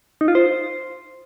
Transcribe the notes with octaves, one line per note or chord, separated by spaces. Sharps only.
D#4
F4
C5